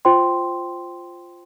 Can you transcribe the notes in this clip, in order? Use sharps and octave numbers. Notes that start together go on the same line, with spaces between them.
F4 C5 G5 C6